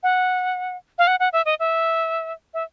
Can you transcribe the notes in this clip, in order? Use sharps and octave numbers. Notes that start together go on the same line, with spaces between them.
F#5
F5
F#5
F#5
E5
D#5
E5
E5